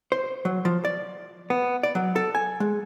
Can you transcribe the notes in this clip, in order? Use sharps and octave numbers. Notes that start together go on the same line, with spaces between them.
C5
F#3
F3
D5
B3
D5
F#3
A4
G#5
G#3